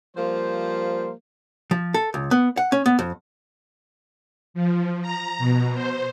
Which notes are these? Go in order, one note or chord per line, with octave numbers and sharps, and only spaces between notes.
F3 G3 A#3 C5
F3
A4
C#2
B3
F#5
C#4
B3
F2
F3
A#5
B2
C5